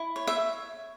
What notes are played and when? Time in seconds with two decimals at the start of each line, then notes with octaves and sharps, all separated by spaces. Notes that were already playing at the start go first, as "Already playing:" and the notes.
Already playing: E4
0.16 C#5
0.27 E5